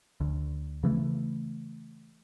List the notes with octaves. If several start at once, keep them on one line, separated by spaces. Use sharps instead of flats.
D2
C#3 E3 A3